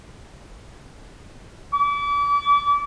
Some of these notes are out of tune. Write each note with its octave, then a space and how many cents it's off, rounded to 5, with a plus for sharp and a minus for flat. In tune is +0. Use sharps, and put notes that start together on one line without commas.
D6 -35